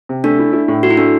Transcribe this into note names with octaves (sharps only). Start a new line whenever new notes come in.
C3
A3 D4
E4
E4
A2
A3 F#4
E4
A3 D4